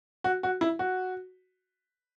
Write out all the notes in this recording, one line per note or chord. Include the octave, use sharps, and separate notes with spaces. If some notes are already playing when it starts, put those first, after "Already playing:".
F#4
F#4
E4
F#4